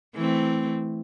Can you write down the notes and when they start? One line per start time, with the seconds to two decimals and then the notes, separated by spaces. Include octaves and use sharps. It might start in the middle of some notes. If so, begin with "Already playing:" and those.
0.14 E3 A3 C4